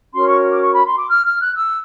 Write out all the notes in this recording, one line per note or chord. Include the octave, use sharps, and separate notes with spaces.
C#4 F#4 A#4 C#5 C6
C#6
D6
C#6
B5
C6
D6
F6
F6
F#6
E6